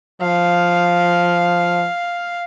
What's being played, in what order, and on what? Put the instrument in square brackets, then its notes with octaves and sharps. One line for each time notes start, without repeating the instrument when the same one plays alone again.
[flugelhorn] F3 [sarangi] F5